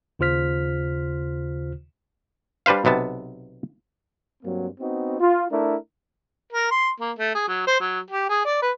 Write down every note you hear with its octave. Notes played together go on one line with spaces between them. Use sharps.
D#2 C#3 F4 C5 F6 B6
G3 D4 B4 C5 F5
B1 C3 B3 A5
G2 F#3 A#3 C4
B3 C4 D#4 F#4
F4
A3 D4 E4 A#4
A#4
C6
A#3
A3
G#4
F#3
C5
F#3
G4
G#4
D5
B4